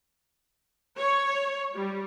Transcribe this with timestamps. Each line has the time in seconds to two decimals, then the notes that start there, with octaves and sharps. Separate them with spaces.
0.98 C#5
1.73 G3